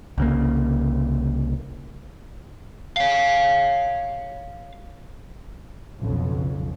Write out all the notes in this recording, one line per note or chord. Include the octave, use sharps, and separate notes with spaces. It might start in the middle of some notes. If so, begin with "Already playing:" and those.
C2 C#3 A#3
C#5 F5
B1 F2 C#3